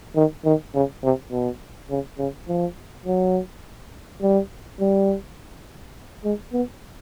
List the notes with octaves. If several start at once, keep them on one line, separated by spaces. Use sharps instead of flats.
D#3
D#3
C#3
C3
B2
C#3
C#3
F3
F#3
G3
G3
G#3
B3